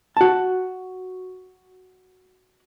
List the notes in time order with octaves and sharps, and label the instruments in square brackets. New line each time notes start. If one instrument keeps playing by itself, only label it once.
[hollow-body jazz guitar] F#4 A5